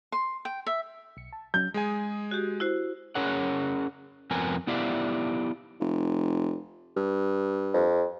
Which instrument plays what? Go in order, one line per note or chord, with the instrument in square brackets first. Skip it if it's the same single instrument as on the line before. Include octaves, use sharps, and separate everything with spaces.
[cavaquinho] C6
G5
E5
[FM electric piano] B1 C#7
A5
[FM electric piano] F#3 C#4 [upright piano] G6
[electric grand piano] G#3 G#4 G#5
[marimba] F#4 G4
E4 F#4 C5
[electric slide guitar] C#4 G#4 A#4 C#5 F#5
F2 B3 C4 A#4 G#5
B3 E4 G4 D5 E5 F5
[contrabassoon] F1
G2
[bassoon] F2